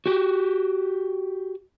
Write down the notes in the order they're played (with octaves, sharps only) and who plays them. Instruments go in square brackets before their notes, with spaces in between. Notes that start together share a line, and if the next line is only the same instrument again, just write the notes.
[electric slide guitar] F#4 G4